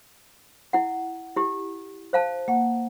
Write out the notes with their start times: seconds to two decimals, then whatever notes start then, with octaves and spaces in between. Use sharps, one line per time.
0.73 E4 F#5
1.36 E4 G4
2.13 C5 F5 A5
2.48 A#3 F#5